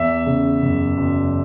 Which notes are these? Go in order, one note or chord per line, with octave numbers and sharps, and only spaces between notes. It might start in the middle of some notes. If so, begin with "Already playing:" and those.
Already playing: E2 E5
C#3
F#1
F#1